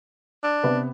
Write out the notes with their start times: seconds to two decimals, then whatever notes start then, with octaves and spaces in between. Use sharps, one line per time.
0.43 D4
0.64 C3 B3